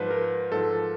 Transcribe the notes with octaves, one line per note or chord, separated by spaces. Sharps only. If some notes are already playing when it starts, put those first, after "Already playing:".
Already playing: G#2 F3 B4 C5
A#4
G#2 F3 A4